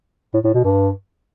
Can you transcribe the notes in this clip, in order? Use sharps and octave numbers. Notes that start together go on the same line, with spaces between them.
A2
A2
B2
G2